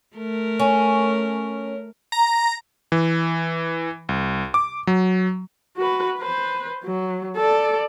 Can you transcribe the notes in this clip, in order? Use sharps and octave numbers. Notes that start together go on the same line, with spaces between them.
A3 A#4
C#4
A#5
E3
C2
D6
F#3
F#4 B4
B4 C5
F#3
A4 D5